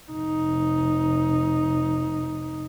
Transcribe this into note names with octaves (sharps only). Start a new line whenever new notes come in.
F1 D#4